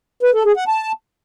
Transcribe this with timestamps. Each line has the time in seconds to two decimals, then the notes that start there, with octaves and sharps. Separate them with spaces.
0.23 B4
0.34 A4
0.45 G#4
0.57 F#5
0.68 A5